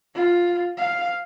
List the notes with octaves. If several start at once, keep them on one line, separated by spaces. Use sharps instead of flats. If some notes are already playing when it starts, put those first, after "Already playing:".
F4
F5